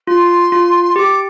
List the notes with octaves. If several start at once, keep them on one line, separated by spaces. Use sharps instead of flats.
F4 C6
F4
G4 D6